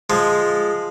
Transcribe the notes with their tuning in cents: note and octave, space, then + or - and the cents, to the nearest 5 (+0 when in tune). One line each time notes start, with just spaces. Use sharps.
F3 +0 G#3 +0